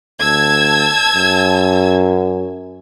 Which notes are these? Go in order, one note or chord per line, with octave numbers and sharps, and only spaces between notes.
D2 A5 E6 G#6
F#2